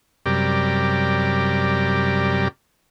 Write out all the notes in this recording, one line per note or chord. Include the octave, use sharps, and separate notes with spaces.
F#2 C3 G3 G4 A#4 D5